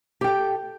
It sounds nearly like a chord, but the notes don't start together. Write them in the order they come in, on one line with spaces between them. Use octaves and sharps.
G4 G5 A4